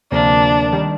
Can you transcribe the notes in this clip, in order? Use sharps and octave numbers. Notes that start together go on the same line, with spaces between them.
D2 C3 F3 A#3 D4
D#3 G3